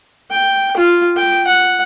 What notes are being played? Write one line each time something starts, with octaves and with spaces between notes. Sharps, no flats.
G5
F4
G5
F#5